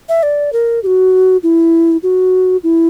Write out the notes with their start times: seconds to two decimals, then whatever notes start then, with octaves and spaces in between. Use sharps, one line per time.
0.09 E5
0.23 D5
0.53 A#4
0.83 G4
0.87 F#4
1.43 E4
2.03 F#4
2.64 E4